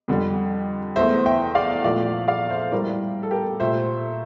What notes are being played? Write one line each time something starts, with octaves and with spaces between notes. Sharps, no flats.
F2 D3 G3
E2 E3 A3 C5 E5
E5 G5
D5 F5
A#2 F3 A3 D5 F5
D5 F5
C5 E5
A2 G3 A#4 D5
A4
G4 A#4
A#2 A3 C5 E5